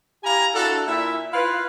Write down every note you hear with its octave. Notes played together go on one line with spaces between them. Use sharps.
E4 G4 F5 G#5 A#5
D4 E4 F#4 A4
A#2 E4 E5
E4 F4 B4 F5